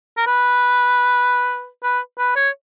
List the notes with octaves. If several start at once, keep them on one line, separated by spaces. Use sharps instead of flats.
A#4
B4
B4
B4
C#5